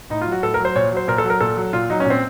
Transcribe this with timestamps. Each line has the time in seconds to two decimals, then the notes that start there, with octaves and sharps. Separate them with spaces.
0.10 A2 D#4
0.21 F4
0.27 F#3
0.32 F#4
0.43 A2 A4
0.54 A#4
0.60 F#3
0.65 C5
0.76 A#2 C#5
0.92 F#3 C5
1.08 A#2 A#4
1.18 A4
1.24 F#3
1.30 A#4
1.41 A#2 A4
1.57 F#3
1.73 A#2 F4
1.90 F#3 D#4
2.00 C#4
2.05 A#2 C4